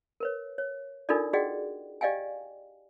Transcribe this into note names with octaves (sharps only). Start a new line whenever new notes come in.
A#4 B4 C#5
C#5
D4 D#4 F4 A4 A#4 D5
F#4 G#4 D5 D#5 F#5 G5
G4 D5 D#5 F5 G5 G#5